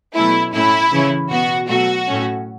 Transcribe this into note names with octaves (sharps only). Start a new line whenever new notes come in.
B2 F#3 A3 C#4 E4
A2 A3 C#4 E4
C#3 E3 C#4
B2 B3 F#4
B2 F#3 A3 F#4
A2 A3 C#4